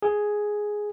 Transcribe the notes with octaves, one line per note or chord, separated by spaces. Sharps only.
G#4